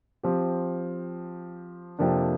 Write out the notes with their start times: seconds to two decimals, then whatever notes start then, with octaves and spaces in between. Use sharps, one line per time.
0.23 F3 C4 G4
1.99 F2 C3 F3 A#3 D4